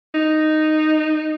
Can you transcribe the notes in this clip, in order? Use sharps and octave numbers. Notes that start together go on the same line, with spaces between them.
D#4